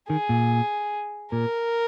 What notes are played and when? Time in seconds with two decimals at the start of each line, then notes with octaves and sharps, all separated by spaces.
0.09 D#3 G#4
0.29 A#2
1.32 A#2 A#4